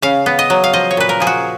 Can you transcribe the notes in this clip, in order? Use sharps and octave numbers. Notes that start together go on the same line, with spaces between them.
C#3 F5
B3
D#5
F#3
F5
F3 D#5
C#5
A#2 B4
A#4
F3 G#4
F#4